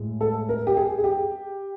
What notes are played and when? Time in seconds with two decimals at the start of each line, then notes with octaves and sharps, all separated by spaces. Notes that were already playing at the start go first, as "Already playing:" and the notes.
Already playing: A2 G#3
0.21 A4
0.49 A#4
0.67 G4
0.77 G#4
0.98 G#4
1.04 G4